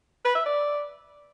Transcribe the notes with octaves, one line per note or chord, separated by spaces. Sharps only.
B4
E5
D5